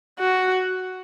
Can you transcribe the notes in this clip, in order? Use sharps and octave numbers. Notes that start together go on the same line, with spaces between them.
F#4